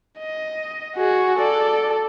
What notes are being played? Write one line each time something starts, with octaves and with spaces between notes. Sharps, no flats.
D#5
F#4 G#4
A4 D5